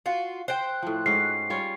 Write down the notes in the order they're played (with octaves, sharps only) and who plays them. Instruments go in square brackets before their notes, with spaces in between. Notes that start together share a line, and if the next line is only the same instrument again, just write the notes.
[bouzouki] F4 F#4 [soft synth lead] F5
[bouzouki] C5 G5 [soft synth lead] F#6
[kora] A2 F3
[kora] G#2 C#4 F#4 [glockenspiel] C7
[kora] G3 F4 C#5